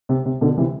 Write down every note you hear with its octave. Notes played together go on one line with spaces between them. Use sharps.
C3
C3
B2 D3
C3 E3